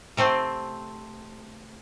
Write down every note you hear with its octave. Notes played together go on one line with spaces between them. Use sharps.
C3 A3 C4